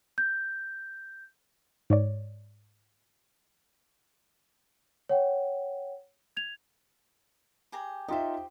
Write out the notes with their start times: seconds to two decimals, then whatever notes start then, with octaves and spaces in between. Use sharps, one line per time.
0.18 G6
1.90 G#2 C#5 D5
5.09 C#5 F#5 G5
6.37 G#6 F7
7.72 G4 G#4 A#5
8.08 D#4 F4 G4 C5 E5